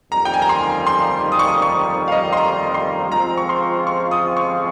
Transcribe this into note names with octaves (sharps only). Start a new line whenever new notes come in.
F2 D#3 G3 A#3 D#4 A#5
G5
G#5
A#5
C6
C6
D#6
C#6
D#6
C#6
F5
D#5
C6
A#5
C6
F3 G#3 C4 F4 A#5
C#6
C6
C#6
D#6
C#6